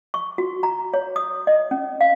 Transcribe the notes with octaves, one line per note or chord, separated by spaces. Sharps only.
C#6
F#4
A#5
C#5
D#6
D#5
C#4
F5